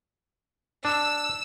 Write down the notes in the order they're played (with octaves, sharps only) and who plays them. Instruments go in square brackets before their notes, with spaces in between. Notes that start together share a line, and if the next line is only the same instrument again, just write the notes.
[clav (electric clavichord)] D4 [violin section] E6